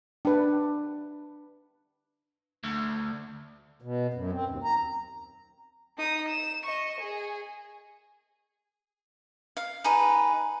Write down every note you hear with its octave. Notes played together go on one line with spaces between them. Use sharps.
D4 B4
D2
B2
F#2
C4
D#2
A#5
D#4 D#6
E7
D#5 C#6
G#4
F5
D#4 G#4 B4